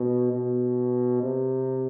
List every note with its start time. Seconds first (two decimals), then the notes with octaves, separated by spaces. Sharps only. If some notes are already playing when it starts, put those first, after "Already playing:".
Already playing: B2
0.33 B2
1.23 C3